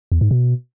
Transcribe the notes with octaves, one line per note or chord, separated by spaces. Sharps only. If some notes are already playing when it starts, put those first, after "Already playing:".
E2
G#2
B2